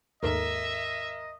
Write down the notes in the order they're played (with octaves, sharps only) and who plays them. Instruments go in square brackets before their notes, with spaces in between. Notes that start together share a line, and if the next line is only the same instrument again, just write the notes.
[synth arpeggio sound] D#2 G#2 A4 [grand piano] A#4 [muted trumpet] D#5 [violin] E5